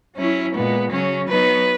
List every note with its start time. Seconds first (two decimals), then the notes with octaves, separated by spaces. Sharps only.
0.16 F#3 C#4 E4
0.54 A#2 G#3 B3
0.91 C#3 F#3 C#4
1.28 F#3 B3 D#4 B4